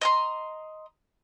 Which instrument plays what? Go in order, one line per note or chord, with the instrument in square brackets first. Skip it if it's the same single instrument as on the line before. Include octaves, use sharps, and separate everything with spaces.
[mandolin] D#5 A#5 C6